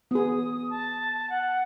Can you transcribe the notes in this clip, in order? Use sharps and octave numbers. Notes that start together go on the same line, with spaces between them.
B3 G#4 D#6
A5
F#5